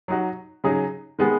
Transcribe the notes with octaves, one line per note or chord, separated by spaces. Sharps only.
F#3 D#4 F#4
C#3 F#3 D#4 G#4
D#3 G#3 B3 G#4